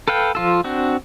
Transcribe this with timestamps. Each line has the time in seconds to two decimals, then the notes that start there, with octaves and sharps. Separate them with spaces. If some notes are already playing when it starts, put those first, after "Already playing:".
0.08 A4 B4 F5 G5
0.35 F3 F4 A4
0.64 C4 D4 F#4